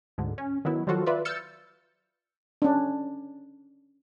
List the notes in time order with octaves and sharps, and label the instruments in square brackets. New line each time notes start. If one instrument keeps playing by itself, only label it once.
[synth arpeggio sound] D2 G#2 D3
C#4
D#3 F#3 B3 E4
D#3 F3 F#3 F4 F#4 A4
F4 B4 D5 E5
E6 F6 G6 A6 C#7
[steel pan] C#4 D4